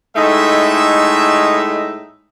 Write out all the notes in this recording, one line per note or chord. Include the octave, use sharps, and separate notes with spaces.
A2 G#3 A3 D#4 E5